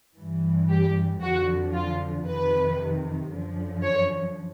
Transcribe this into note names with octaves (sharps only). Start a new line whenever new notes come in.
G2 E3
G4
F2 D3 F3 F#4
F4
F2 C3 D#3 B4
F#2 D3 F3
C#5